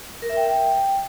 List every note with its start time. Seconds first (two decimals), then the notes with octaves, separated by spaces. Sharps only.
0.22 A#4
0.29 E5
0.37 G5